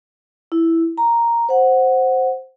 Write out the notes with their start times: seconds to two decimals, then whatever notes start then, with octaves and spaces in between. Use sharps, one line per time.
0.52 E4
0.97 A#5
1.49 C5 F#5